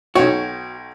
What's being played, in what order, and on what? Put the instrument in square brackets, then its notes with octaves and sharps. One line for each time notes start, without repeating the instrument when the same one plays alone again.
[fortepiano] B1 C#5 [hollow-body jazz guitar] F#4 [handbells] G5 G#6